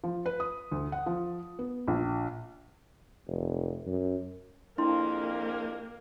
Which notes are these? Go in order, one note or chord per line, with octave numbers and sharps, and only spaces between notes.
F3
B4
D#6
D2
F#5
F3
B3
A#1
F1
F#2
A#1 F2 A#3 D4 E4 C6